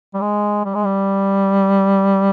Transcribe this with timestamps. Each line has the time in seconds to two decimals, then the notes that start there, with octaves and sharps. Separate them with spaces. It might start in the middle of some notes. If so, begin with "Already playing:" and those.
0.14 G3
0.21 G#3
0.65 G3
0.75 G#3
0.85 G3